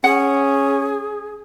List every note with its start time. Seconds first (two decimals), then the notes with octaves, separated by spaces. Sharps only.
0.04 C#4 G#4 F#5